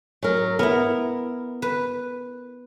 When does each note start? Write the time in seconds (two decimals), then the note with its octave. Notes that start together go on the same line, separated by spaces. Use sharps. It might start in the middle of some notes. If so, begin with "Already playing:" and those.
0.23 F#3 A#4
0.59 B3 E4 A#4
1.62 B4